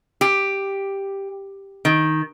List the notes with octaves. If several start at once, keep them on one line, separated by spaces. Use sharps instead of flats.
G4
D#3